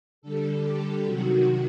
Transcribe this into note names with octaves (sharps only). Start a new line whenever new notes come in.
D3 G3 A4
G4
C3 D#3 F#3 F#4